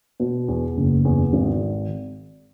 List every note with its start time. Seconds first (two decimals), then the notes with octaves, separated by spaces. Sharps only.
0.20 B2
0.48 E2
0.77 F#1
1.05 E2
1.33 G#1